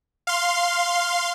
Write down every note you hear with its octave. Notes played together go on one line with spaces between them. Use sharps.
F5 C6